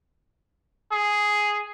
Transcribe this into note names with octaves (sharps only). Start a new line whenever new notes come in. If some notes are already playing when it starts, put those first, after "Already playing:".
G#4